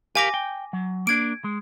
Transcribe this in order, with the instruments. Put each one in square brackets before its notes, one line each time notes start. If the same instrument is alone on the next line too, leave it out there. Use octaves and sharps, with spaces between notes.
[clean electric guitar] G4 A#4 F5 [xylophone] G#5 D6 A#6
[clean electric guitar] G5
F#3
[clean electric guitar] A#3 D4 [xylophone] G#6 D7
[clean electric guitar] G#3